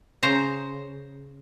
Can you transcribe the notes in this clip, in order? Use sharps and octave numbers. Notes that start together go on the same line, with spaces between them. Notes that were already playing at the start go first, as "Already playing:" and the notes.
C#3 C5 A#5